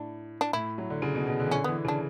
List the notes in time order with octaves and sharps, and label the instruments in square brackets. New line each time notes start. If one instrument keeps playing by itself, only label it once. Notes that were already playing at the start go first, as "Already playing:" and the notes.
Already playing: [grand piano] A2 [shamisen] D4
[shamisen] D4
[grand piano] A2 [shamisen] E4
[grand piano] F#3
D3
C#3
B2
B2
D3
E3
[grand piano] D3 [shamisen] C#4
[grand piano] E3 [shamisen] B3
[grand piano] C#3 [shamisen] D4